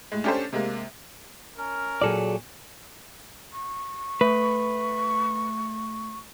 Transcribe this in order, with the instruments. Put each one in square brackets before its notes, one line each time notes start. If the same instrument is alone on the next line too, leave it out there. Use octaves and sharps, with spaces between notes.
[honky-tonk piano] A2 G#3
C#4 D4 G4 A4 C5
C3 G#3 A#3
[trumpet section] C#4 A#4
[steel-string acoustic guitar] A#2 F#3 F#4 [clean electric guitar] G#4 A4 D5
[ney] C#6
[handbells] A3 [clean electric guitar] B4